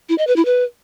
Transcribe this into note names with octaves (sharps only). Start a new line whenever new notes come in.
E4
D#5
B4
E4
B4